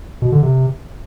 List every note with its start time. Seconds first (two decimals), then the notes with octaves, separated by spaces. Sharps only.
0.22 B2
0.32 D3
0.42 C3